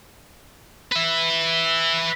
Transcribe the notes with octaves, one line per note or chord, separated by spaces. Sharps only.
B4 E5